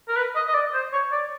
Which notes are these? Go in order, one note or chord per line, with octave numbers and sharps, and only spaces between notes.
A#4
B4
D#5
D#5
D5
C5
C#5
D5